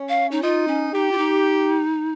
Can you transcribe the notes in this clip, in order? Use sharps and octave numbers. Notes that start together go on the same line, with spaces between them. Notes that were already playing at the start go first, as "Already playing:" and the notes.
Already playing: C#4
F5
D#4
D#4 F4
C#4
D#4 G4
F4
D#4